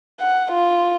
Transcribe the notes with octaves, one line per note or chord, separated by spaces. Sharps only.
F#5
F4